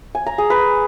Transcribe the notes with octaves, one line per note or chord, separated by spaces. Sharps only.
G#5
A#5
G#4
B4